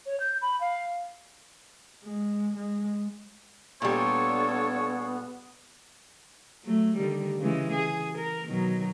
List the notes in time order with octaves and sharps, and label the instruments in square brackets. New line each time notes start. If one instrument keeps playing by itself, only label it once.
[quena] C#5
G6
B5
F5
[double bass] G#3
G#3
[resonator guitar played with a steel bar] A#2 G3 [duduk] B3 [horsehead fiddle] D4 A4 [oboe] C#5
[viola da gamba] F#3 A3
D3 D#3 G3
C#3 E3 G#3
G#4
A#4
B2 D#3 F#3